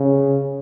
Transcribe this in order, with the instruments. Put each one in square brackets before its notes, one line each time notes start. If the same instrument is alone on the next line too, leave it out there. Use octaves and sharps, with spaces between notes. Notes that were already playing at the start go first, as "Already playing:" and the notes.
Already playing: [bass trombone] C#3